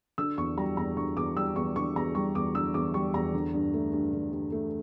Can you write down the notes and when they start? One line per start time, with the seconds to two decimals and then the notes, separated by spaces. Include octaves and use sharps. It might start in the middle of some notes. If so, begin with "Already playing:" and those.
0.18 D3 E6
0.38 E2 C#6
0.57 G3 A#5
0.77 E2 A#5
0.96 D3 C#6
1.16 E2 D6
1.36 G3 E6
1.56 E2 C#6
1.76 D3 C#6
1.96 E2 A#5
2.15 G3 C#6
2.35 E2 D6
2.55 D3 E6
2.74 E2 D6
2.94 G3 C#6
3.14 E2 A#5
3.34 D3
3.54 G2
3.73 A3
3.93 G2
4.13 D3
4.33 G2
4.52 A3